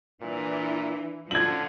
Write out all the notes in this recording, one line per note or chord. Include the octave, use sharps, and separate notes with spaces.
A#2 E3 D4
D3 F3 C#4 F4 G#6 F#7